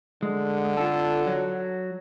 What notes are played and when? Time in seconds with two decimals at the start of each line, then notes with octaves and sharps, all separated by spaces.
0.23 D3 G#3
0.77 F4 A4
1.27 F#3